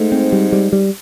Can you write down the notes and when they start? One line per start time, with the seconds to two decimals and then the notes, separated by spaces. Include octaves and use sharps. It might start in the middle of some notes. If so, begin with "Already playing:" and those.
Already playing: G#2 A3
0.12 C4
0.32 G3
0.52 G3
0.72 G3